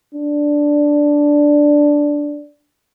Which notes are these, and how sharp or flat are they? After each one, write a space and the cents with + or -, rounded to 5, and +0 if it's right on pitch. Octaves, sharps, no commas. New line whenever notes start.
D4 -5